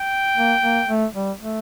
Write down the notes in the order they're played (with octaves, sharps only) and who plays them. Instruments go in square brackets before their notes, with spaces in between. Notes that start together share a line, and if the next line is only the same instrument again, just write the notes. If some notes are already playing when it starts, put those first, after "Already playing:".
Already playing: [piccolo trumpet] G5
[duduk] A#3
A#3
A3
G3
A3